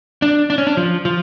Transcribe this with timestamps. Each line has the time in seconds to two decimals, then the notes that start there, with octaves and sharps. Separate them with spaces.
0.22 D4
0.50 D4
0.58 C#4
0.67 D4
0.77 F3
1.05 F3